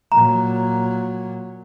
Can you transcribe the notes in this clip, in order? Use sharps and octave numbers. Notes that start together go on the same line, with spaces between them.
A#2 F#3 A#5